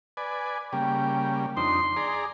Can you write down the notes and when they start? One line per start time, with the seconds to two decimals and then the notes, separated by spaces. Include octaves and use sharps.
0.17 B4 D5 G#5
0.73 C#3 G3 A#3 G5
1.57 F2 D4 D#4 C6
1.96 G#4 D5 A#5